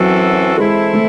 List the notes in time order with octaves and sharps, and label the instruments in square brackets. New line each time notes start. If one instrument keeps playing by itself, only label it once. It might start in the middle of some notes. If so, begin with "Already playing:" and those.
Already playing: [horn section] F#2 E3 C4 F#4 A4 [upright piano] F#3
[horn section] E3 C4 E4 A4 [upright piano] G#3
[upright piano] A3